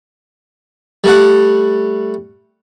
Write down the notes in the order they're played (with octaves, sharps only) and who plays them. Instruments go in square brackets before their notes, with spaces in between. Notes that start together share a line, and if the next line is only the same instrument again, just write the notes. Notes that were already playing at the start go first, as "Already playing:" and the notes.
[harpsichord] G3 A3 F#5